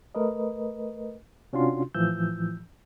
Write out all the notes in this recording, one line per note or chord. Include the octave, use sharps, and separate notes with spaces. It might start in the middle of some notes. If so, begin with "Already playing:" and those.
A3 A#4 B4 D#5
C3 C#4 D4 F4 F#4 C6
A2 E3 F3 E6 G6